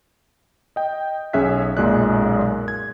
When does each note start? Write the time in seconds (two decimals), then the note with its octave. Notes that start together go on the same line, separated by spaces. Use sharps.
0.76 D#5 G5
1.33 B1 C#4 G#4 E5 F#6 B6
1.77 B1 F#2 A#2 G#3 D5 F#6
2.68 G#6